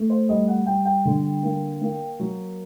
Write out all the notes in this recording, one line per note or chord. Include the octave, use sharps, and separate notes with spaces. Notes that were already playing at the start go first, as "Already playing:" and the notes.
Already playing: A3
C5
G3 D#5
F#5
G3 G5
G5
D3
A#3
A#3
F#3